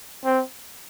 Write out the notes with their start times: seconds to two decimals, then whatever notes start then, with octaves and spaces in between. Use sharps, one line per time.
0.25 C4